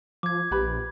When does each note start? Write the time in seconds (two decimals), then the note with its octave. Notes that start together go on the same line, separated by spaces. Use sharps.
0.23 F3 D6 G#6
0.51 A#1 G4 B4 B5